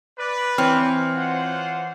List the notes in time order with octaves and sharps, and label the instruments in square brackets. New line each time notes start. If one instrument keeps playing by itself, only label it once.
[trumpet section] B4 D5
[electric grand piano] E3 C#5 F6 [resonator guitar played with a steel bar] C4
[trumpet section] F4 C5 F#5